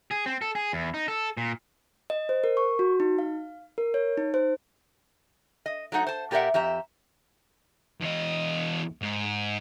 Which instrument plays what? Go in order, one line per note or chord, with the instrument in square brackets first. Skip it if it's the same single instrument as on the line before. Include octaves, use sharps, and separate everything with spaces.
[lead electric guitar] G#4
C4
A4
G#4
E2
D#4
A4
A#2
[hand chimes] D#5
C5
A#4
C#6
F#4
D#4
F5
A#4
C#5
D#4
C5
[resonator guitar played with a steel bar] D#5
F#3 A3 D#4 F#5
C5 A5
A#2 G4 A#4 D5 E5 F#5
F2 G4 E5 A#5
[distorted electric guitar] E2 D#5
G#2